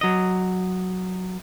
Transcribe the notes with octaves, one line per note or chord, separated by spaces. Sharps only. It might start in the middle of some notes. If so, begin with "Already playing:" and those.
F#3 D#5